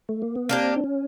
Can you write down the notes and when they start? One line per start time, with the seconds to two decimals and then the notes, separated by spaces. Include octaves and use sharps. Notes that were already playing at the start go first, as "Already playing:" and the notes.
0.09 A3
0.22 A#3
0.36 B3
0.49 A#3 C4 D4 G4
0.76 D4
0.84 C#4